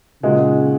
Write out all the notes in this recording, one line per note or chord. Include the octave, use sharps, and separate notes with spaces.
A#2 C#3 G#3 D#4 F#4